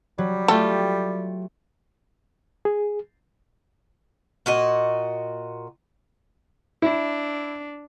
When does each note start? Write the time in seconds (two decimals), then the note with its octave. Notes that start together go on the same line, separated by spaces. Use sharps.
0.18 F#3 G3
0.48 A3 F4 G4 A4
2.65 G#4
4.46 A#2 F#4 D#5
6.82 D4 E4